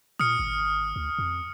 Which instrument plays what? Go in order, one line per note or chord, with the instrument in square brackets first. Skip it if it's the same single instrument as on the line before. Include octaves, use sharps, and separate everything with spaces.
[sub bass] A#2 [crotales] D#6 F6 C#7
[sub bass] G#1
D2
F2